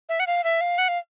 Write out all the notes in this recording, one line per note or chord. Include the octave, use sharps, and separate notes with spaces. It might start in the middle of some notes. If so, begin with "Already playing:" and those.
E5
F#5
F5
E5
F5
F#5
F5